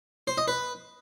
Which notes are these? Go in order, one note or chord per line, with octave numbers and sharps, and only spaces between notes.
C5
D#5
B4